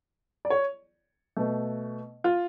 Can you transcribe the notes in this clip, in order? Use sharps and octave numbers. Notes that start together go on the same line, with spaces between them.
D5
C#5
B2 A3
F4